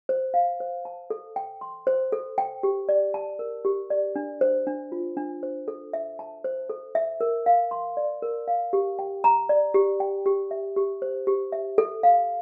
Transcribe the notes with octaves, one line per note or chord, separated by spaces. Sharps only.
C5
F5
C5
A5
A4
G5
C6
C5
A4
G5
G4
D5
A5
A#4
G4
D5
D4
C5
D4
F4
D4
C5
A4
E5
A5
C5
A4
E5
A#4
F5
C6
D5
A#4
F5
G4
G5
A#5
D5
G4
G5
G4
E5
G4
C5
G4
E5
A4
F5